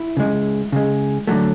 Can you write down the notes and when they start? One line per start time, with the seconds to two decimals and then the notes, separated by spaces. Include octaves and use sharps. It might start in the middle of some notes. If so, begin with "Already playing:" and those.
Already playing: E4
0.17 C#3 G#3
0.72 C#3 G#3
1.27 D3 F#3 A3